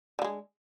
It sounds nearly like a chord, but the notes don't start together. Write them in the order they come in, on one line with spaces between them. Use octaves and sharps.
D3 A#3 G#3